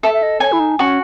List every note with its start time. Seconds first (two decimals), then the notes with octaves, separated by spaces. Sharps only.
0.03 A4 E5
0.14 E5
0.23 D#5
0.40 C#5 G#5
0.52 E4
0.60 D#4
0.79 C#4 F#4